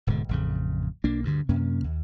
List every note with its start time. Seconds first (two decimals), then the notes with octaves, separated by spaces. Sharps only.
0.07 D1 G#2 B2 D3
0.29 A1 F2 C#3
1.04 B1 A#3 D4
1.23 D2 G2 D3
1.49 F#2 C3 A#3 C#4
1.84 D#2